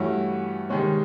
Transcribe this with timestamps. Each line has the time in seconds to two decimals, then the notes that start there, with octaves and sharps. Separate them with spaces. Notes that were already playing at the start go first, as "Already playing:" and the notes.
Already playing: G2 E3 A3 C#4 F#4
0.69 C3 D#3 G#3 C#4